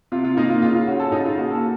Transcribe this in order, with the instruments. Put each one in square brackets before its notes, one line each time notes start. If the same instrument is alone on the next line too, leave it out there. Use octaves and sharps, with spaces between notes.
[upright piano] C3 F4
F4
A#3 D#4
F4
C#3 F4
F4
C#4 F#4
A4
C#3 D#4
F4
A#3 F#4
A4